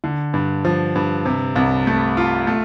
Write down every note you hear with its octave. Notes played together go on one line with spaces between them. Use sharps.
D3
G2
F3
G2
C3
C2
A3
F4
A3